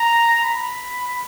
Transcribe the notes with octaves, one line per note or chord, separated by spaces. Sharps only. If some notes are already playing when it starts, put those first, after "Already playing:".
Already playing: A#5
B5